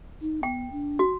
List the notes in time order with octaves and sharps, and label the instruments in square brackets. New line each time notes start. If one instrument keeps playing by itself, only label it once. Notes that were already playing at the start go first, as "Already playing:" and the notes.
[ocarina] D#4
[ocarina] B3 [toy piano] G5
[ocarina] D4
[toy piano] F#4